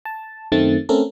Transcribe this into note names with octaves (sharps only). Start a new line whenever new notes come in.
A5
F#2 D#3 A3 C4 A6
A3 C4 C#4 A4 A#4